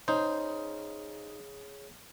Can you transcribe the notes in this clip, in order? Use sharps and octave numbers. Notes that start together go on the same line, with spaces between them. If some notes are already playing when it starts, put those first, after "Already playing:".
C#3 D#4 C5